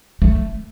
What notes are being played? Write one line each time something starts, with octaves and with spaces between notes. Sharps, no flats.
A3